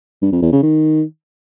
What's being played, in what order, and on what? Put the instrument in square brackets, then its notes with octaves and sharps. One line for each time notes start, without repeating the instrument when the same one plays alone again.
[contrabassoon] G2
F2
E2
C#3
D#3